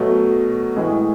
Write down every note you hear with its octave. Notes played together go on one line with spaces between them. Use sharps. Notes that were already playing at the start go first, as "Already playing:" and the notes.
Already playing: B2 F#3 A3
A2 E3 G#3